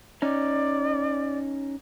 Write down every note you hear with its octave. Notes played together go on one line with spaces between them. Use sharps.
C#4 D#4 D5